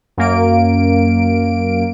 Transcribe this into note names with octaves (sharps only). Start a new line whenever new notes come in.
F#2 A#3 D7